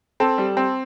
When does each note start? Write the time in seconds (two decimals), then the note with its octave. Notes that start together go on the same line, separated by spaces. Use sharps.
0.20 C4 A4
0.38 G3
0.57 C4